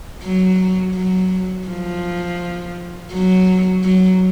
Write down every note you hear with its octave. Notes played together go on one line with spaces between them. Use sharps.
F#3
F#3
F3
F#3
F#3